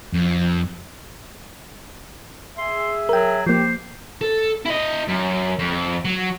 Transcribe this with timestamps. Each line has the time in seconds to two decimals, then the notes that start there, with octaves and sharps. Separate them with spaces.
0.14 F2
2.58 G#4 E5 C6
3.09 F#3 A#4 G5
3.47 F3 A#3 G4 C5
4.21 A4
4.65 E4 D#5
5.08 F#2
5.59 F2
6.05 F#3